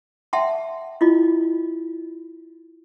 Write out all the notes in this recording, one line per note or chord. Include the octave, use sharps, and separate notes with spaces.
E5 F#5 G5 A5 C6
E4 F4 D#5